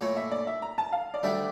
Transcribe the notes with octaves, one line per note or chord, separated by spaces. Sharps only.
A#2 A3 E4 C#5
E5
D5
E5
A#5
A5
F5
D5
D2 D3 G3 D4 E5